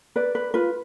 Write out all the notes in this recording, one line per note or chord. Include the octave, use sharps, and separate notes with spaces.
B4 D5
B4
F4 B4